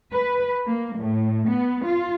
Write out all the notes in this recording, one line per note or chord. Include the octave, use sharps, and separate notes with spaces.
B4
A#3
A2
B3
F4